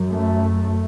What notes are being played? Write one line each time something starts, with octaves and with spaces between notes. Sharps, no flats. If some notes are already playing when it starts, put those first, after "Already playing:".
Already playing: F#2
A3